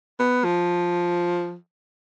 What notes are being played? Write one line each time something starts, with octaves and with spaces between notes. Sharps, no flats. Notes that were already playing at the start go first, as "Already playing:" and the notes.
B3
F3